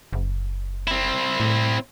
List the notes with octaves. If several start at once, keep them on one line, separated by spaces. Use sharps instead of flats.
F#1
C4 E4
A2